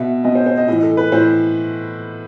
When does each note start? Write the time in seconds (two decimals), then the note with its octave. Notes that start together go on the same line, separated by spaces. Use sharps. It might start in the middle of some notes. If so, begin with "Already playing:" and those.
Already playing: B2 E5
0.24 B2 D#5
0.35 C5
0.46 C5
0.58 D#5
0.68 A2 E3 D#5
0.83 A4
0.97 B4
1.12 A2 E3 C5